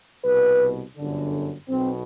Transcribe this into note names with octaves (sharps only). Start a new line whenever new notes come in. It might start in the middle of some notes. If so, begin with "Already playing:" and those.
C2 B2 B4
G1 F#2 D3
B1 B2 C4